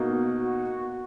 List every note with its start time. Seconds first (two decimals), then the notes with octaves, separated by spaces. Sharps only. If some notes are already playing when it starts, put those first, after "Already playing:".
Already playing: B2 A#3 D#4 F#4
0.40 F#4